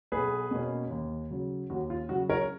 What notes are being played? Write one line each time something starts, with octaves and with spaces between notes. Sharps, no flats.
B1 G#4 B4
B2 A#3 C#4
D#2
C#3 F#3
D#2 F#4
F4
C#3 F#3 F#4
A#4 C#5